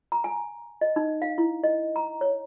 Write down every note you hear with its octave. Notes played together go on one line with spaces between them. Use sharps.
A#5
G#5
D#5
D#4
F5
E4
D#5
A#5
C#5